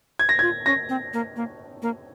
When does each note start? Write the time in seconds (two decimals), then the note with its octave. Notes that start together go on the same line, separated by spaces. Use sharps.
0.19 G#6
0.29 A#6
0.39 F4 G#6
0.66 C#4 A#6
0.89 C4
1.13 A#3
1.36 A#3
1.82 A#3